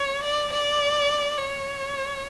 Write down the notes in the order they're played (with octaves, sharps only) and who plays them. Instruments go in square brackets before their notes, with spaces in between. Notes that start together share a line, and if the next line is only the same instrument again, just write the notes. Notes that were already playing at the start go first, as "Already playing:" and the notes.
Already playing: [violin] C#5
D5
D5
C#5